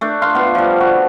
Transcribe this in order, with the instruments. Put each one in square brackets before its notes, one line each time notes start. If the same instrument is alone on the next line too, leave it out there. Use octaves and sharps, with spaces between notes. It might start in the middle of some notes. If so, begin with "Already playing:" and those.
[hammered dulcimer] A3 D4
F5 C6
B3 F4
F3 G3
F#4